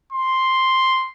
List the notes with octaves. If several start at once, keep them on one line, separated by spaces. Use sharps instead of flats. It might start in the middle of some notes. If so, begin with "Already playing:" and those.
C6